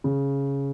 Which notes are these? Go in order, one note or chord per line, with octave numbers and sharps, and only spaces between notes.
C#3